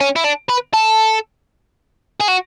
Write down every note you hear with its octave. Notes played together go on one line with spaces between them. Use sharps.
C#4
E4
D4
B4
A4
G#4
F#4